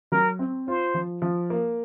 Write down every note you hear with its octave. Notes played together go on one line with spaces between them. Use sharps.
F#3 A#4
C4
F4 C5
F3
F3
A#3